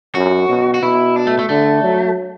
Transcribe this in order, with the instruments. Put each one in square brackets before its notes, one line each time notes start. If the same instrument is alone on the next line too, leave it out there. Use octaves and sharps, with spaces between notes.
[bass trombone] F#2 [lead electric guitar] F#4
[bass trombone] B2
[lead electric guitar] F#4
[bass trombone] B2 [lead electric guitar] E4
[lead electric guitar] D4
A3
A3
[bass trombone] D3 [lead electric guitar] A3
[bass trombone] F#3